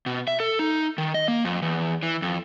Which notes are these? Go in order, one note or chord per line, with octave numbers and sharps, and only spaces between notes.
B2
E5
A4
D#4
D#3
D#5
A#3
F2
E2
E3
F2